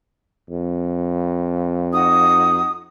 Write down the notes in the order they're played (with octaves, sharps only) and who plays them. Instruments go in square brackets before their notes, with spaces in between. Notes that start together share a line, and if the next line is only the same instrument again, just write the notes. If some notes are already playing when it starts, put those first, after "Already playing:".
[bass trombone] F2
[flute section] D#4 F#4 D#6